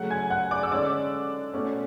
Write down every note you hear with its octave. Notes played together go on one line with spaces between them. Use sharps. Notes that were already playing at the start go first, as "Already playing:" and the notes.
Already playing: C#3 F#3 A3 C#4 F#5 F#6
G#5 G#6
F#5 F#6
D5 D6
E6
D3 G#3 C#4 D5 D6
B2 A3 C#4